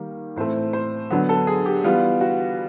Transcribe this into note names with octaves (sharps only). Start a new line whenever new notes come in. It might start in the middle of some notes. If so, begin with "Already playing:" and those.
Already playing: D#3 G3 A#3
A2 E3 A3 C4 C5
C5
D3 F#3 B3
A4
G#4
G4
E3 G3 B3 F4
F#4